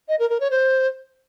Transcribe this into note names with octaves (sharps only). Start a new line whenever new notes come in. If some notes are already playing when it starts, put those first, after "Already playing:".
D#5
A#4
A#4
C#5
C5